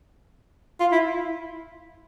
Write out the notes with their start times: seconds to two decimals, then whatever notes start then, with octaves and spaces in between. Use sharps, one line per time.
0.80 F4
0.92 E4